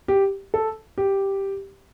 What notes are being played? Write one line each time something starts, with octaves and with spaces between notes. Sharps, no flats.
G4
A4
G4